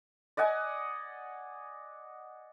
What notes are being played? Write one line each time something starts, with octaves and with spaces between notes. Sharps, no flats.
D5 D#5 F#5 G#5